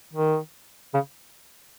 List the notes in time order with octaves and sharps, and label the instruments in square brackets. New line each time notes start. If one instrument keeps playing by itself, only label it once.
[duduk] D#3
C#3